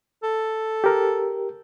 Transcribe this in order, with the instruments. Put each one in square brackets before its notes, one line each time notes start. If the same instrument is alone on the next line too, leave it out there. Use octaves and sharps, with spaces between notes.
[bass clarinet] A4
[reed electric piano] G4 A#4